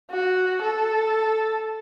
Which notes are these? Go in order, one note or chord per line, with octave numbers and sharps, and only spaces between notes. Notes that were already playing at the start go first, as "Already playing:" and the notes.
F#4
A4